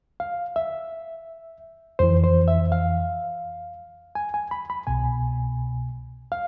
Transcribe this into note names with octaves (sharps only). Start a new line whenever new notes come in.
F5
E5
F2 E3 C5
C5
E5
F5
G#5
G#5
B5
B5
C2 B2 G#5
F5